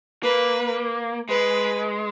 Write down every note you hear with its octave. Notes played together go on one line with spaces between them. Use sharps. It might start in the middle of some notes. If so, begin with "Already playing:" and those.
A#3 B4
G#3 B4